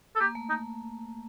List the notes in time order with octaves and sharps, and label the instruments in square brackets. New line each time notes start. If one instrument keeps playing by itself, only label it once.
[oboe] A4
[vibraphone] A#3 [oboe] G4
[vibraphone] A3
[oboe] D#4